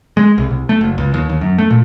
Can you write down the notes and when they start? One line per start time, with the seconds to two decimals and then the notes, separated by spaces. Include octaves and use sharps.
0.17 G#3
0.38 C2
0.50 C2
0.69 A3
0.81 F#1
0.98 C#2
1.14 D#2
1.29 D#2
1.41 F#2
1.58 A3
1.70 A#2